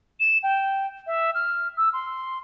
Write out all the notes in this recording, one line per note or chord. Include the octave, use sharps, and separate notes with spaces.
E7
G5
E5
F6
E6
C6